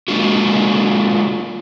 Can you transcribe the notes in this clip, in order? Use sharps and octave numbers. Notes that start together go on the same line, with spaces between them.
G#3 A#3 D4 F4 F#4